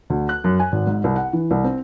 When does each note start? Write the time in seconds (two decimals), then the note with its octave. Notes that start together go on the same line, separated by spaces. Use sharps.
0.10 D2
0.29 F#6
0.44 F#2
0.60 G#5
0.72 G#1
0.87 G#2
1.04 C2
1.16 F#5
1.33 E3
1.51 C2
1.64 C4